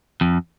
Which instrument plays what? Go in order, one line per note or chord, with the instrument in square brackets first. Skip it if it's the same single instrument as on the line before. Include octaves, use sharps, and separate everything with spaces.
[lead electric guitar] F2